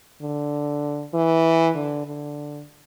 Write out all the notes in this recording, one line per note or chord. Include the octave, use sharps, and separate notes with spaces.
D3
E3
D3
D3